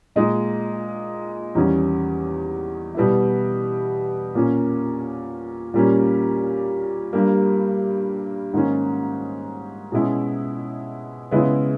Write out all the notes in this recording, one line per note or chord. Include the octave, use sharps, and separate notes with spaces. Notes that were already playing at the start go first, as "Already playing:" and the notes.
A#2 G#3 D#4
E2 D#3 G3 C#4
B2 G3 B3 E4
A#2 A#3 C#4
A#2 G3 A#3 C#4
G2 G3 A#3
G#2 D#3 A#3 C#4
B2 G#3 C#4 E4
C#3 G#3 B3 E4